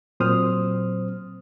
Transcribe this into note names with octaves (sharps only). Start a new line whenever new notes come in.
A#2 F#3 C4 C5 D#6 F6